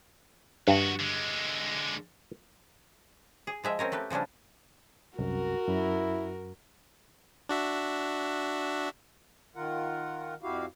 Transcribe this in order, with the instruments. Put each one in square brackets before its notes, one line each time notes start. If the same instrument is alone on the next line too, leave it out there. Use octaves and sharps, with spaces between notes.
[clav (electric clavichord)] G2 [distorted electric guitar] D#3 F#4
[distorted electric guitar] D3 G#3
[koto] G#4
F3 G#3 E5
C4 C#4 A#4
A3 G4 B4
C#3 F3 G3 C#4 D4
[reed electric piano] C2 F#2 [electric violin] F#4 A#4
[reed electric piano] F#2 [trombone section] E4
[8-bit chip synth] D4 F#4 E5
[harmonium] D#3 F4 A#4 F#5
F2 E4 F#4 G4 F5